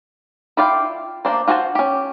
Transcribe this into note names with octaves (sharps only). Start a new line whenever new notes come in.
E4 F4 D5 F5 G5
A#3 C4 D4 C5
F4 F#4 C5 G#5 A5
C#4 G4